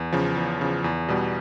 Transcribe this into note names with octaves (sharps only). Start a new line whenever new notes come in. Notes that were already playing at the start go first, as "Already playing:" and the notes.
Already playing: E2
C#3 F3
E2
C#3 F3
E2
B2 G3 B3